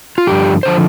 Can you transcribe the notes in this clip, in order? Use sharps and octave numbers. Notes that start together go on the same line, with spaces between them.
F4
G2 D3 F3 G4
D3 F3 C5